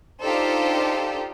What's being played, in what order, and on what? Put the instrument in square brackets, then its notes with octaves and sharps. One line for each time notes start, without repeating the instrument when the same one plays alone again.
[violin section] D4 D#4 F4 G4 A4 C5